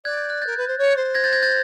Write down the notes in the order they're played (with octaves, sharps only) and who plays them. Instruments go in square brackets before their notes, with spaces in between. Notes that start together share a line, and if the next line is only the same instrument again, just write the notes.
[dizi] D5 [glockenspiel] F#6 G#6
[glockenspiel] G6
F#6
[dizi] A#4 [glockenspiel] G6 A6
[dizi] B4
C5
C#5
C5
[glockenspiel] G#6 A#6
G6 A6
G#6 A#6
G6 A6